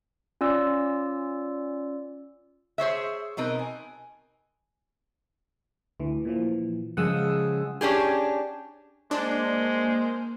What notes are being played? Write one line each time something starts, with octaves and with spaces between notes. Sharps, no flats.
C#4 F4 D5 E6
G#4 C5 C#5 E5
B2 C4 D#4 A#4 B4
G#5
D2 E3
A#2 E3 F3
C#3 F3 G#3 F#5 D#6 E6
C#4 D4 G4 G#4
G#3 A#3 D4 C5